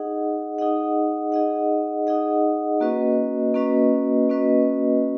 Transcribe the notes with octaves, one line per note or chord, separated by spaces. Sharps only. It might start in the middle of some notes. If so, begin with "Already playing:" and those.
Already playing: D#4 G#4 D#5 F#5
D#4 G#4 D#5 F#5
D#4 G#4 D#5 F#5
D#4 G#4 D#5 F#5
A#3 C#4 F#4 B4 D#5
A#3 C#4 F#4 B4 D#5
A#3 C#4 F#4 B4 D#5